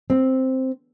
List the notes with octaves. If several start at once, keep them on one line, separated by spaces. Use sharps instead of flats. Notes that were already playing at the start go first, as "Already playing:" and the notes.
C4